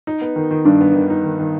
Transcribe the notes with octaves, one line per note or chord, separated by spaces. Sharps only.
D#4
B3
D#3
D#3
G2 D4
B3
D#3
D#4
D#3
D#3